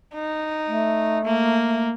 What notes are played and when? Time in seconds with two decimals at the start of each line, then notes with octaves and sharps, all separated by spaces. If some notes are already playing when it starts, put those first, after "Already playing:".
0.15 D#4
0.67 A3
1.25 A#3